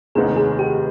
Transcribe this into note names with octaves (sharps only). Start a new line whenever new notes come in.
F1 D#2 D#3 B3 G#4
G#4
G4